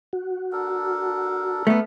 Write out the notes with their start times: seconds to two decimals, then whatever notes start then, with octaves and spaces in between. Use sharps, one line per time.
0.13 F#4
0.52 D4 A4 A#4
1.67 A3 B3